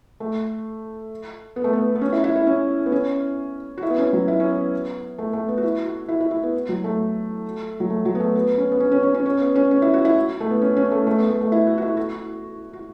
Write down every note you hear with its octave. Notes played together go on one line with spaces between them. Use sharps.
A3
B3
A3
B3
B3
C#4
E4
E4
E4
C#4
B3
C#4
F#4
E4
B3
C#4
F#3
E4
C#4
B3
A3
A3
B3
F#4
E4
F#4
E4
E4
E4
B3
F#3
A3
F#3
A3
F#3
B3
A3
B3
C#4
B3
C#4
C#4
C#4
C#4
C#4
B3
C#4
C#4
E4
F#4
E4
A3
B3
C#4
C#4
A3
A3
B3
A3
A3
E4
F#4
F#4
E4
F#4
F#4